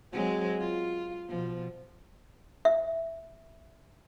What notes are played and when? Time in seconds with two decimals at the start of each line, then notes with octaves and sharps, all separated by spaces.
0.13 F#3 G#3 C4
0.60 F4
1.29 B2 F3
2.65 E5